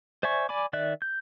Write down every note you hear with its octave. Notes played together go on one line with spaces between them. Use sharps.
C5 D5 E5 G#5 C#6
D5 G#5 B5 D6
D#3 D5 E5 F#6
G6